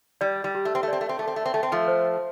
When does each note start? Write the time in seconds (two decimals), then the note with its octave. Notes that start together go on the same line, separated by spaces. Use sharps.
0.21 G3 D5
0.44 G3
0.55 G4
0.65 A3
0.75 C4
0.83 A3
0.88 C4 D5
1.01 A3
1.09 C4
1.19 A3 A4
1.27 C4
1.36 A3
1.45 C4
1.54 A3 G5
1.63 C4
1.72 F3 A3
1.88 C5